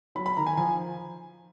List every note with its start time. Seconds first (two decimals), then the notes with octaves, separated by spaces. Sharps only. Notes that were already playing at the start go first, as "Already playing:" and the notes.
0.15 F#3 B5
0.26 B5
0.37 D#3 A#5
0.46 G#5
0.57 F3 G#5